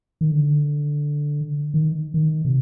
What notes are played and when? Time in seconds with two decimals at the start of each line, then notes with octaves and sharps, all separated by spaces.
0.21 D#3
0.31 D3
1.74 D#3
2.14 D#3
2.45 C3